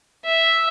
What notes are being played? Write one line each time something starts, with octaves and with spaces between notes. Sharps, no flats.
E5